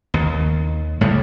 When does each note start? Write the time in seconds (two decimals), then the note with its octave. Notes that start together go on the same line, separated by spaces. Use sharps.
0.14 D#2
1.01 A2 C#3 G3